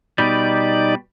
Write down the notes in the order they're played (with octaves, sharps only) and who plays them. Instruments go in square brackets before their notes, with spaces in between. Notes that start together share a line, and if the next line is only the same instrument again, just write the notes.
[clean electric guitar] B2 G3 [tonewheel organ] D#4 D5